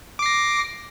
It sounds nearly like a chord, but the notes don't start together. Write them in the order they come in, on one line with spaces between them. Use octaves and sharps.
D6 C7 A#6